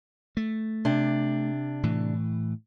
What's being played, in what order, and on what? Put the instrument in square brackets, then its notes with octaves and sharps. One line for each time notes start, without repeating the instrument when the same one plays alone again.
[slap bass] A3
[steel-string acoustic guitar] C3 D4
[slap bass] A2 E3